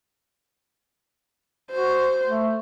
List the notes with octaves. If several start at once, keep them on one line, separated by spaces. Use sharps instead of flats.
F#4 C5
A3